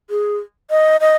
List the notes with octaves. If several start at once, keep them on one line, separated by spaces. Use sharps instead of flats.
G#4
D#5
D#5